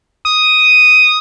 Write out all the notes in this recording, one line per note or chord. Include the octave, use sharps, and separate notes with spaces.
D#6